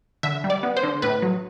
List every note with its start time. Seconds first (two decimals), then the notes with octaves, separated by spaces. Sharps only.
0.23 D3 E5
0.44 G3
0.50 D5
0.63 B3
0.77 C5
0.83 D3
1.02 A2 B4
1.22 F#3